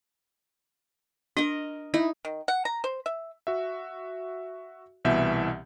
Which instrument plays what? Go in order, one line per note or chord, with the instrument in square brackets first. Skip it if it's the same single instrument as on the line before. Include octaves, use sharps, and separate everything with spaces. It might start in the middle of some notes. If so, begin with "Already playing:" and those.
[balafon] D4 [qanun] A#4 D#5
[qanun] D#4 [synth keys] E4 [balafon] E5
[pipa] D#3
F#5
A#5
C5
E5
[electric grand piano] F#4 E5
C2 B2 E3 E5 G6